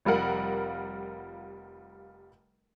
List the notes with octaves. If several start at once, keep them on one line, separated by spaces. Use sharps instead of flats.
F1 G3 F4 A#4 F#5